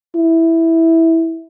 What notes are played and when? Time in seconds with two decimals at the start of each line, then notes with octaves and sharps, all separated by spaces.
0.16 E4